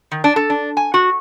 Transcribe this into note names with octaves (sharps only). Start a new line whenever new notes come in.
D#3
D4
A4
D4
G#5
F#4